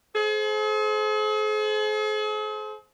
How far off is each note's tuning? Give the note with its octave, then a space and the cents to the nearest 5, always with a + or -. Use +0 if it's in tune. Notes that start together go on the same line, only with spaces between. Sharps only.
G#4 +45 C5 +0